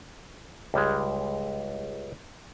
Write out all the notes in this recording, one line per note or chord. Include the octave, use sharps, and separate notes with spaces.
C#2 G3 G#3